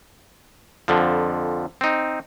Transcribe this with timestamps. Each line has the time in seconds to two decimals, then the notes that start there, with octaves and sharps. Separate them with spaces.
0.88 F2 D3 F3
1.81 C4 D#4